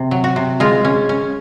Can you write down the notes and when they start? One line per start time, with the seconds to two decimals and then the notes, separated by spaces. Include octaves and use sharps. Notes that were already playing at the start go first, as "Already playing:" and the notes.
Already playing: C3
0.11 F#3
0.24 F#4
0.36 C3
0.60 G#3 F4
0.85 C#4
1.09 C#4